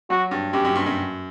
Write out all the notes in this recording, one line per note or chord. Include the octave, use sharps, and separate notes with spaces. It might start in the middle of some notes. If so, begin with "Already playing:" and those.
F#3 F#4
G2
F#2 G4
F#2
G2
F#2